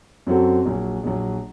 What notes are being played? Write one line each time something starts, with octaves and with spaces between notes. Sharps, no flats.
F#2 F#3 C4 F#4 A4
A#1 A#2 F#3
A#1 A#2 F#3